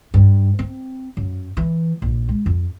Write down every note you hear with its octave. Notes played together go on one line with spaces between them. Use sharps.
G2
C4
F#2
E3
A#1
G#3
F2